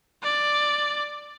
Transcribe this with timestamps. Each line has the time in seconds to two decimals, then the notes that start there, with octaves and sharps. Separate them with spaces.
0.23 D5